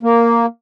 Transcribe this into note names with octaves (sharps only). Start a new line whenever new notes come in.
A#3